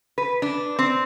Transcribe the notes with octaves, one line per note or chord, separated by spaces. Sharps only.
B4
D4
C4